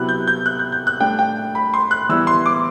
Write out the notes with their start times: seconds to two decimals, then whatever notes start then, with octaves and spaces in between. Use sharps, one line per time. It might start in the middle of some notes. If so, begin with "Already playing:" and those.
Already playing: C3 F#3 B3 E4 F#6
0.09 G6
0.27 G6
0.46 F#6
0.59 G6
0.72 G6
0.87 F#6
1.00 A2 G3 D4 G5
1.19 G5
1.55 B5
1.74 C6
1.91 F#6
2.09 E3 G3 B3 E4 E6
2.27 C6
2.46 D6